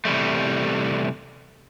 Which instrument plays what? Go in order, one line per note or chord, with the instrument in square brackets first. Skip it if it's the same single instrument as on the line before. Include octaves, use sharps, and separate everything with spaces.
[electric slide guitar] C3 E3 F3 G3 A3